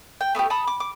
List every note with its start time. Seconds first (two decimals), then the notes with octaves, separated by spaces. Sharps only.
0.21 G5
0.35 A3 B3 D#4 G4
0.50 A4 A5 B5 D#6
0.67 D6
0.80 D6